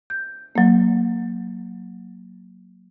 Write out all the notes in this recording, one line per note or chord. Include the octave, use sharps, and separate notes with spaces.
G6
F#3 A#3